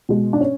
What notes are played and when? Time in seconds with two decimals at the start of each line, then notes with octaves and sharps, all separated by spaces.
0.09 B2 G#3
0.33 D4
0.41 C#4